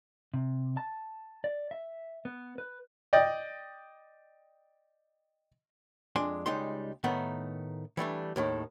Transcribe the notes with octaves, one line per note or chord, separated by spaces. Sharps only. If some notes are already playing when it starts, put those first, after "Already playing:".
C3
A5
D5
E5
B3
B4
D5 D#5 G5
F2 G#3 D4 G#5 C6
C#2 G3 G#3 D#4 C6
A2 D#3 A3 B3 D#4
E3 G3 A3 D4
D#2 A2 D#3